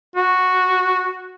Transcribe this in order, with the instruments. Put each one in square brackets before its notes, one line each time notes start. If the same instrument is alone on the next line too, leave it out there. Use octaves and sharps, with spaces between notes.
[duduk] F#4